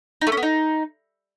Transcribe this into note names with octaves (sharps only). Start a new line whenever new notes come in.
D#4
A3
C#4
B3
D#4